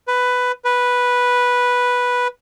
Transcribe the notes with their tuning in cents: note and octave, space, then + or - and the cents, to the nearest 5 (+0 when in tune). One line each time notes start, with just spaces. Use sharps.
B4 +10
B4 -5